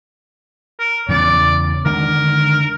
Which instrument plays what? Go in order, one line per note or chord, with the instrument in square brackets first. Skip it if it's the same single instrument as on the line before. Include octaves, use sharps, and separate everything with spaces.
[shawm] A#4
[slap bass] E2 C#3 [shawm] D5
[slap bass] D3 D#3 G#3 [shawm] A#4